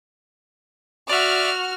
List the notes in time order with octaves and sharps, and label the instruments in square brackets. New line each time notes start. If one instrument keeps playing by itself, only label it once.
[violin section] F#4 F6 [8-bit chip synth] D5 E5